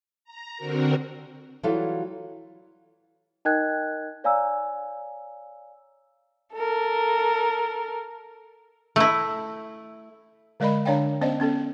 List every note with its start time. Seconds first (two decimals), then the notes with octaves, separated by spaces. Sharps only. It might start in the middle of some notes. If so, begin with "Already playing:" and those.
0.24 A#5
0.57 D3 C4 F#4 A#4
1.63 E3 F#3 G3 F4 A4 F5
3.45 D#4 A#4 D#5 G5 F#6 G#6
4.24 C#5 D5 F5 G#5 A#5 E6
6.54 A4 A#4
8.96 A3 E4
10.60 D3 G#3 A#4 D5 D#5 B5
10.85 D3 D4 C#5 D5 F5 G5
11.21 B3 C#4 C5 D5 D#5
11.40 B3 C#4 A4